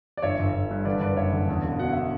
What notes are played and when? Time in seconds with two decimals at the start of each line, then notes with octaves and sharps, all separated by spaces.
0.17 D5
0.22 G1 C#5 E5
0.39 G1
0.54 G1
0.71 G2
0.85 D3 B4 D5
1.01 F#1 B4 D5
1.16 F#1 C#5 E5
1.33 D3
1.49 E2
1.64 E1
1.79 B2 F#5
1.93 E5